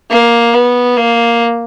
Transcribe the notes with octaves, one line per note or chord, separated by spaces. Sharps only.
A#3
B3
A#3